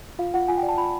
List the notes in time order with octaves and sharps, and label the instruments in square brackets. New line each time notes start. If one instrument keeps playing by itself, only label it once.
[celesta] F4 F5
F4 F#5
F4 G#5
G5
D5
A5
F4 B5